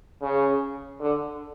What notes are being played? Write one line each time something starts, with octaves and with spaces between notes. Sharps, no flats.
C#3
D3